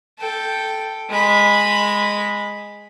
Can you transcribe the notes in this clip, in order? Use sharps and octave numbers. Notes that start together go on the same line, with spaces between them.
A4 G5
G#3 B5